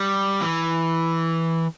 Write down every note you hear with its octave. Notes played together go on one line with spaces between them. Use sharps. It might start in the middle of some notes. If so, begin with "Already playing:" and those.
Already playing: G3
E3